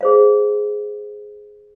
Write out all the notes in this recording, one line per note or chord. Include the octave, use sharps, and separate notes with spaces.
G#4 C5 F5